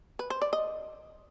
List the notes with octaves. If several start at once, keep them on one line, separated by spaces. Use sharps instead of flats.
B4
C5
D5
D#5